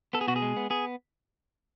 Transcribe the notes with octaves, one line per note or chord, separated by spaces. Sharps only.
B3 A4
G#4
B2 F#4
G#4
G#3
B3
B3 G#4